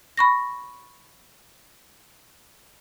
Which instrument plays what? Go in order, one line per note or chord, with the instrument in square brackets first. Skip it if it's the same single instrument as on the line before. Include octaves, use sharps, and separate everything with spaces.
[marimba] B5 C#6 A#6